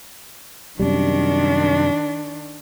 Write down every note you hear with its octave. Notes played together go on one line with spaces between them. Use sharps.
F#2 C3 D#3 G3 D4